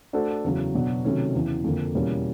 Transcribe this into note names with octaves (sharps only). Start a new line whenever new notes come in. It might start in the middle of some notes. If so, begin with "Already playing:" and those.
A3 D4 F#4 A4 C5
E2 C#3 F#3
B2 F#3 B3 D4 F#4
C3 D#3 F#3 A3 C#4
E2 C#3 E3
F2 D3 F3 A#3
E2 B2 G3 A#3 C#4